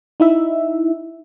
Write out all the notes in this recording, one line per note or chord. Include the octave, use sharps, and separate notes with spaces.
D#4 E4 E5